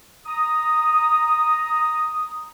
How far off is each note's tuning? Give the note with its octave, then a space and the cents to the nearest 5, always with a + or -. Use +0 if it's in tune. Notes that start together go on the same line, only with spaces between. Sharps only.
A#5 +0 D#6 +0